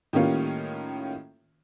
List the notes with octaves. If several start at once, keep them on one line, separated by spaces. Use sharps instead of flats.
A2 D#3 G3 A#3 C#4 F4